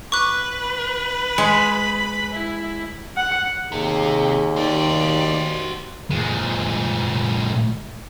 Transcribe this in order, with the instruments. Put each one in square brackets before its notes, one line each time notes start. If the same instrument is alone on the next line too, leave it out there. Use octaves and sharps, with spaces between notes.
[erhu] B4 [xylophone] C#6 D6 F#6
[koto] G#3 [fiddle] B5
[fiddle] E4
[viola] F#5
[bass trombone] D#2 [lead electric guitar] C3 [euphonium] G#4
[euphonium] D#3 [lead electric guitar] F#4 C5 [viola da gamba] G4 D5
[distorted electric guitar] A#2 G#3